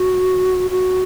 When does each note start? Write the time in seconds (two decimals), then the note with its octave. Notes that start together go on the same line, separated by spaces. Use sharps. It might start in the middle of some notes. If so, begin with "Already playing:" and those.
Already playing: F#4
0.70 F#4